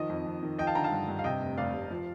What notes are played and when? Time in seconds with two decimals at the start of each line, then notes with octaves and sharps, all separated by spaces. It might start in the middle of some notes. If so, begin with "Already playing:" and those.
Already playing: D#3 F3 D#5
0.09 F2
0.26 F2
0.43 D#3
0.59 F3 D#5 G5
0.67 F5 A5
0.75 D3 G5 A#5
0.84 F5 A5
0.91 G2
1.08 G2
1.19 F5
1.24 C3 D#5 G5
1.41 F1
1.58 F1 D5 F5
1.73 F1
1.91 F3